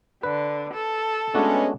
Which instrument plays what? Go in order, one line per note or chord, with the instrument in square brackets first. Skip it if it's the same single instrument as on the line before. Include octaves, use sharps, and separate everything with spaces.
[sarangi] D3 [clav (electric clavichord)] B4
[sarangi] A4
[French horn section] G#3 B3 C#4 [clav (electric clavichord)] A3 D4 F#4